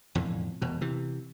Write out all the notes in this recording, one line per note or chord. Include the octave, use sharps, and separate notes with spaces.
E1 F2 A2 D3
E1 B2
C3 E3